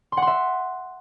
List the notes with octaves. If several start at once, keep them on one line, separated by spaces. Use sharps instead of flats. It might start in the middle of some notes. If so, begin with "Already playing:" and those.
C6
F#5
C6
E5